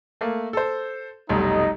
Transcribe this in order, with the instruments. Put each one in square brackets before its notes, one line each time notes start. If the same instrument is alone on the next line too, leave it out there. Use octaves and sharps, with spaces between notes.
[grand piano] A3 A#3
A4 C5
[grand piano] F1 B1 [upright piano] G3 [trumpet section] D#4 D#5